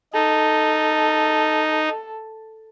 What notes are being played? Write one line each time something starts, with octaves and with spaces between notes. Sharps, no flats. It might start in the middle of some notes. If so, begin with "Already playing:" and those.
D#4 A4